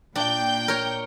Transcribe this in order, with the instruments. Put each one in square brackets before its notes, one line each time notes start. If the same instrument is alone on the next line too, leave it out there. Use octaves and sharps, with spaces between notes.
[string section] A#2 G5 G6 [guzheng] D4
[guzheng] A#4 C#5